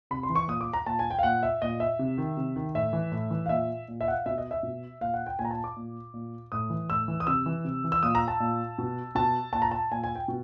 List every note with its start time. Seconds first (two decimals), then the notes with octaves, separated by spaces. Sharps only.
0.11 C3 B5
0.23 C6
0.29 E3
0.35 C#6
0.48 A#2 D#6
0.61 D6
0.73 A#5
0.86 A#2 A5
0.99 G#5
1.11 G5
1.19 F5
1.23 A#2 F#5
1.43 E5
1.62 A#2 D#5
1.80 E5
1.99 C3
2.18 D#3
2.37 C3
2.56 D#3
2.75 A2 E5
2.93 E3
3.12 A2
3.30 E3
3.46 F5
3.49 A#2 E5
3.88 A#2
4.01 E5
4.08 F#5
4.12 F5
4.26 B2 E5
4.38 D#5
4.51 E5
4.63 B2
5.01 A#2 F5
5.14 F#5
5.26 G5
5.39 A#2 G#5
5.45 A#5
5.51 A5
5.64 D6
5.76 A#2
6.14 A#2
6.52 A2 D#6
6.70 E3
6.90 A2 E6
7.08 E3
7.20 D#6
7.27 C3 E6
7.46 E3
7.65 C3
7.84 E3
7.92 E6
8.03 A#2 D#6
8.15 A#5
8.28 A5
8.40 A#2
8.78 B2
9.15 B2 A5
9.53 A#2 A5
9.62 A#5
9.71 A5
9.91 A#2 G#5
10.04 G#5
10.15 G5
10.28 B2